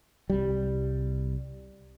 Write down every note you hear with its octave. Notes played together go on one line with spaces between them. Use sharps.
C2 G3